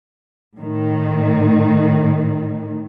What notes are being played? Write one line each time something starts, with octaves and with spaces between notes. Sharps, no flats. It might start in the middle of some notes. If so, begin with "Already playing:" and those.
A2 D#3